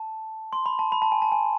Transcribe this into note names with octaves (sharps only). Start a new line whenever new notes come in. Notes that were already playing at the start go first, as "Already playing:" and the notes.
Already playing: A5
C6
B5
A5
B5
A5
G#5
A5
G#5